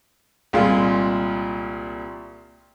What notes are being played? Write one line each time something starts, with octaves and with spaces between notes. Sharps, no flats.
C2 A#2 G#3 F4